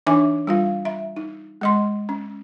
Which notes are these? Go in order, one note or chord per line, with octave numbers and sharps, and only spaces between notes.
E3 D4 D#4 E5 G#5 D6
G3 F4 F5
E5
D#4
G#3 D#5 C6
C#4